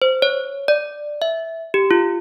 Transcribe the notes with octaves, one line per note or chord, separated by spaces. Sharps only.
C5
C#5
D5
E5
G4
F4